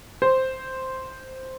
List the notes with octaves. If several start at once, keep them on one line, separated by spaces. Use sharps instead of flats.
C5